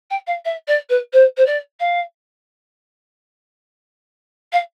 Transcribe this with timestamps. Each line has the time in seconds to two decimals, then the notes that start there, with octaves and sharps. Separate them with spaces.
0.10 G5
0.27 F5
0.45 E5
0.67 D5
0.89 B4
1.13 C5
1.37 C5
1.46 D5
1.79 F5
4.52 F5